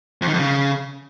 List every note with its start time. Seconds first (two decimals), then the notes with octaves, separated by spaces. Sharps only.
0.22 F2
0.27 D#3
0.33 F2
0.39 C#3